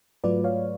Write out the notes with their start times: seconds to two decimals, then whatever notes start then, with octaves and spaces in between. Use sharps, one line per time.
0.24 G#2 F#3 A3 F4 B4 D5
0.44 C#5 F5